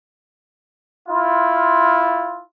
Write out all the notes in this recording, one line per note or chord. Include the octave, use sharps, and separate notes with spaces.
E4 F4